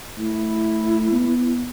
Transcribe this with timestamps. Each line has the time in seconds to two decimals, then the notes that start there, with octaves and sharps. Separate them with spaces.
0.17 A3 E4
1.12 B3